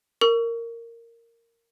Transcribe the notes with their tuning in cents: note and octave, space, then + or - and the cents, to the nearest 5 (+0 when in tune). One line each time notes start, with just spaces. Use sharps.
A#4 -10 C#6 +30